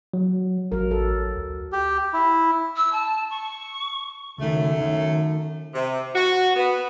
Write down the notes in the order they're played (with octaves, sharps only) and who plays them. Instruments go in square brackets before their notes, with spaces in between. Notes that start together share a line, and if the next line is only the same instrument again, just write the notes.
[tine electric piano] F#3
[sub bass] A1 [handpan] F#3 A#4
[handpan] A4
[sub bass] D2
[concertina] G4
E4
[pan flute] E6
A5
C#6
[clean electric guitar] C#2 D#3 [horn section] F#2 A3
[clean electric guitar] D#3
[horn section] C3
F#4
B3